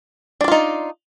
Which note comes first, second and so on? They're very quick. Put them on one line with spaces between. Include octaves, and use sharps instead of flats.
D4 D5 F4 D#4